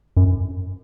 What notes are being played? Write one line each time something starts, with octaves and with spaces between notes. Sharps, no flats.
F#2